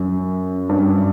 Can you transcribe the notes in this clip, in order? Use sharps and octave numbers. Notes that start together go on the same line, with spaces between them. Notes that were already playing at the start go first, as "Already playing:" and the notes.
Already playing: F#2
G2